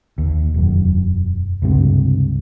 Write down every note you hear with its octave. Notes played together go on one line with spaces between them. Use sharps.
D#2
E1 F#2
C#2 G2 C3